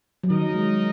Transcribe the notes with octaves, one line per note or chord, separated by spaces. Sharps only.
F#3
D#3 D#4 A#4 D#5
G#3